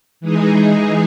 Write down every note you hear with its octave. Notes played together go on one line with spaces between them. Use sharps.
E3 G#3 D#4 G#4